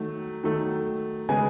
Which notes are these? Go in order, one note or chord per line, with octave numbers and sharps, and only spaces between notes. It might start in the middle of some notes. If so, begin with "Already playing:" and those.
Already playing: D#3 F#3 A3
D#3 F#3 A3
C#3 G#3 B3 G#5